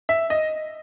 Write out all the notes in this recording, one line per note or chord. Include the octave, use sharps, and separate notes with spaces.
E5
D#5